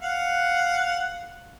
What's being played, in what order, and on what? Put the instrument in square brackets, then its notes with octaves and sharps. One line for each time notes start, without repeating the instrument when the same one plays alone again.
[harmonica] F5 F#5